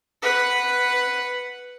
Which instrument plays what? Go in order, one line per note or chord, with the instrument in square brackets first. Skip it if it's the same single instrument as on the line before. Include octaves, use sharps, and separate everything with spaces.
[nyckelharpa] B4 F#5